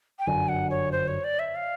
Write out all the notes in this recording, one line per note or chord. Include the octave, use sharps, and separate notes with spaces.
G5
G1 F#2 D3 F#3 G#5
F#5
C#5
C5
C#5
D5
E5
F5